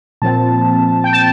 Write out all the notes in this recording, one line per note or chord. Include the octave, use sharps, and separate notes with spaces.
A#2 F3 C4 A5
G5
A5